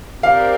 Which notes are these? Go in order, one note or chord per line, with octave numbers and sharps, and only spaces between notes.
C4 G4 A#4 D5 F5